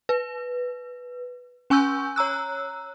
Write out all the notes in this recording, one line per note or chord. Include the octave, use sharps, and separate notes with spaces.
B4
C#4 G#5 C#6 E6 G6
C#5 A#5 E6 F#6